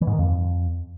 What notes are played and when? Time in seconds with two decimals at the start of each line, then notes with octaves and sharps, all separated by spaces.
0.01 E3
0.07 G#2
0.13 D#3
0.19 F2